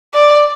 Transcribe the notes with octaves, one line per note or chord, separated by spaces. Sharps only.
D5